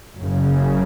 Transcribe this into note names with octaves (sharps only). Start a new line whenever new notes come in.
F#1 F#2 C#3